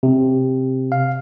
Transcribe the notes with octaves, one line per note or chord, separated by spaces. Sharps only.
C3
F5